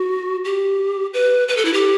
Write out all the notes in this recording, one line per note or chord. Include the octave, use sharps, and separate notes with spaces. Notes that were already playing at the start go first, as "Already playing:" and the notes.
Already playing: F#4
G4
B4
B4
A4
E4
G4